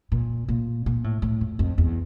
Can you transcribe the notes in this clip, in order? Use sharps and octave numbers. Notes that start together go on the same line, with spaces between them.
A#2
A#2
A#2
A2
A2
F2
F2
E2